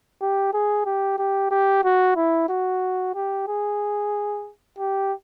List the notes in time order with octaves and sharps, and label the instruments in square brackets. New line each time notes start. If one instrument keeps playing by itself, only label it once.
[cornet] G4
G#4
G4
G4
G4
F#4
E4
F#4
G4
G#4
G4